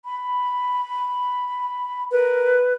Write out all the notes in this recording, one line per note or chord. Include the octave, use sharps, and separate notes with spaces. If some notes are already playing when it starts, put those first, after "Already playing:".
B5
A#4 B4